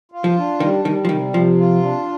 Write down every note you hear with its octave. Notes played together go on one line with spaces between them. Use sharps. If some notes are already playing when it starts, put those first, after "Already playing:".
F4
F3
D4
D#3 G3
D#3 G3
F3
C3 D#3
C3 F3
F4
D4